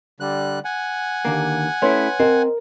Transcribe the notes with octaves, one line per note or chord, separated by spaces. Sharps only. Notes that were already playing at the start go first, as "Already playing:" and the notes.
D3 G3 F#6
F#5 G#5
D#2 D3 A#3
A3 C#4 E4 B4 C#5 C6
C4 A#4 D#5